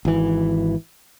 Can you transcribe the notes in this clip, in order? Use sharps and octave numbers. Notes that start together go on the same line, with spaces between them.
G#1 E3